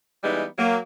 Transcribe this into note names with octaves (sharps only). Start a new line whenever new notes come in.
E3 G3 G#3 B3 D#4
F#3 A#3